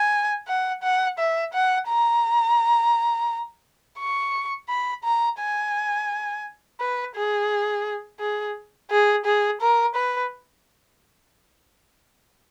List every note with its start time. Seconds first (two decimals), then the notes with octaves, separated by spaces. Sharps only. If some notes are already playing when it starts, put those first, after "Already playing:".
Already playing: G#5
0.48 F#5
0.83 F#5
1.19 E5
1.53 F#5
1.88 A#5
3.99 C#6
4.69 B5
5.04 A#5
5.40 G#5
6.80 B4
7.15 G#4
8.20 G#4
8.90 G#4
9.25 G#4
9.61 A#4
9.95 B4